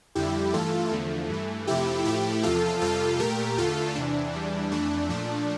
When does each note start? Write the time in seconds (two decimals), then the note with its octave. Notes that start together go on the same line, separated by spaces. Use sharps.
0.15 F2 D3 G3 E4 G4
0.53 G2 E3 A3 F4 A4
0.92 E2 D3 F3 A3
1.29 G2 E3 A3
1.67 F2 C3 F3 A3 E4 G4
2.05 A2 F3 A3 E4 G4
2.43 E2 C3 F3 F4 A4
2.81 F2 C3 G3 F4 A4
3.19 A#2 A3 G4 A#4
3.57 E2 D3 A3 F4 A4
3.95 E2 C3 E3 D4
4.33 E2 E3 G3
4.71 F2 E3 A3 D4
5.09 A#2 F3 A3 D4